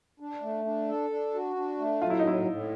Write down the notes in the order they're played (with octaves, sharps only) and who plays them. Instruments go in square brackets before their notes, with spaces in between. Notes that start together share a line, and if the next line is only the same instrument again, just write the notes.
[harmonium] D4
A3
D4
A4
D4
F#4
D4
A3
[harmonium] F#3 [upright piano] F4
[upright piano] E4
D#4
[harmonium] A2 [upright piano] E4
[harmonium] A2